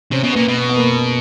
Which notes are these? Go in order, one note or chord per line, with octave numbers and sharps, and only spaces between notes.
C3 C#4
B2
A#2 B3
B2
B3
B3
A#3